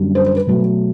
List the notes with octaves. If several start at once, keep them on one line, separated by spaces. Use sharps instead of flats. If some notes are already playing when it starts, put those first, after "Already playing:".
Already playing: F#2 D3 G3 A#3 D4
C5
C5
B4
B2 F#3 A3